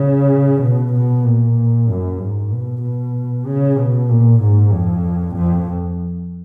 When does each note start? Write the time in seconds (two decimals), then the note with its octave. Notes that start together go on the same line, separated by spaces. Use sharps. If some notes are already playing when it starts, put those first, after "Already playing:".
Already playing: C#3
0.61 B2
0.93 B2
1.25 A#2
1.88 F#2
2.20 G#2
2.51 B2
2.82 B2
3.46 C#3
3.77 B2
4.09 A#2
4.40 G#2
4.72 F2
5.36 F2